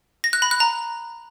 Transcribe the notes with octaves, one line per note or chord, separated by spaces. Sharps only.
A#6
F#6
B5
F#6
A#5